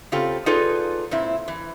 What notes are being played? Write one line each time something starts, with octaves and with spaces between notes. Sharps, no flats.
C#3 C4 F4 G4 A4
D#4 F4 G#4 A4 B4 D5
A#2 C4 E4
E3